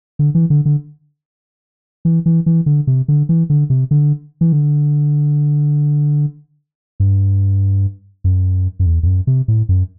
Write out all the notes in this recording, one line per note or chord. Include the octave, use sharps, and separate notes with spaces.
D3
E3
D3
D3
E3
E3
E3
D3
C3
D3
E3
D3
C3
D3
E3
D3
G2
F#2
F#2
E2
E2
F#2
C3
A2
F#2